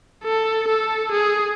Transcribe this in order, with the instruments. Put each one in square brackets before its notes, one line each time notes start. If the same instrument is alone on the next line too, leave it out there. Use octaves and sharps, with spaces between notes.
[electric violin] A4
A4
G#4